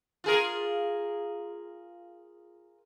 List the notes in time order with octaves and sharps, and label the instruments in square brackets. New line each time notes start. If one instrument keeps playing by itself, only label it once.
[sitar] F4 G#4 A#4